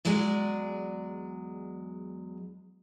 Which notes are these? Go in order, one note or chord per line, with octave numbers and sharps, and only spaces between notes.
E2 F#3 G#3 D5 F#5 G#5